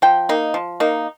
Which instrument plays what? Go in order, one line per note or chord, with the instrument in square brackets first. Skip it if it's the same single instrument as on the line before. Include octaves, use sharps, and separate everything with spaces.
[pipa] F3 G5
A#3 D#4
F3
A#3 D#4